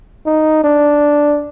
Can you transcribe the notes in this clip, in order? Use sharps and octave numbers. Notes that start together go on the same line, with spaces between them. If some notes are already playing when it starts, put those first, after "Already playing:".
D#4
D4